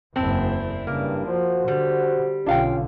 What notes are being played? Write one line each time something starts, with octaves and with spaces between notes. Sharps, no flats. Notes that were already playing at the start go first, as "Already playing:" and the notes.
F#1 E2 C4 D4 E4
G2 C#3 A#3
F3 F#4 C5
D3 G3
B1 D3 C#4 D4 F4 F5 G5